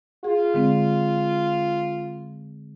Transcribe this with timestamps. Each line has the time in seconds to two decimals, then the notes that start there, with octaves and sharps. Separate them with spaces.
0.24 F4 G#4
0.54 D3 G#3 C4